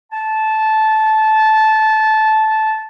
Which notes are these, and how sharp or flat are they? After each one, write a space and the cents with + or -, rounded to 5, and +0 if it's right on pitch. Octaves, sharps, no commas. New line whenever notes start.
A5 -15